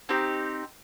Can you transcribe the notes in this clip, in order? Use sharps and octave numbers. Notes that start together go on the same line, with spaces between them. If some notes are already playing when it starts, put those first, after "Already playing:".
C4 D#4 G4